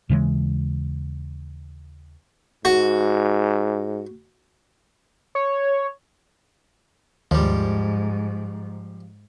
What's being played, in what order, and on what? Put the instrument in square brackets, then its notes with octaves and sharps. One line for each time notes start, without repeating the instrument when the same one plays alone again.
[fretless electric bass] D#2 C#3 E3 G#3
[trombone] G#2 [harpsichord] F#4
[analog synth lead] C#5
[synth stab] D#2 [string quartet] G#2 [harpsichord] F3 G3